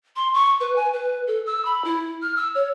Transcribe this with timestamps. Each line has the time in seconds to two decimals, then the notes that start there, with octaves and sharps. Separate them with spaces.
0.16 C6
0.34 C#6
0.60 B4
0.76 G#5
0.93 B4
1.27 A4
1.46 E6
1.65 B5
1.85 E4
2.22 F6
2.36 E6
2.55 C#5